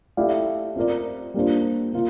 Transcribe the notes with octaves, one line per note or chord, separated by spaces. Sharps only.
A3 E4 G4 D5 F5
C4 F4 A#4 D5
G3 A#3 D4 F4 C5
A#3 F4